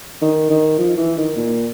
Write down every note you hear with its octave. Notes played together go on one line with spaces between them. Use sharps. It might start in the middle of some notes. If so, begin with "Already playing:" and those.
D#3
D#3
F3
E3
D#3
A#2